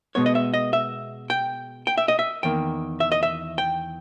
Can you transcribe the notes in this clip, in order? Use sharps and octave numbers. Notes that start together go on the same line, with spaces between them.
B2 G#3 B3 C#5
D#5
E5
D#5
E5
G5
G5
E5
D#5
E5
E2 D#3 A#3 G5
E5
D#5
E5
G5